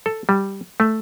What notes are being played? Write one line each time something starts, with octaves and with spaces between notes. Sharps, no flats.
A4
G3
A3